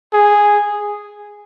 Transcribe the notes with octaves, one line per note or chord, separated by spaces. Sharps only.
G#4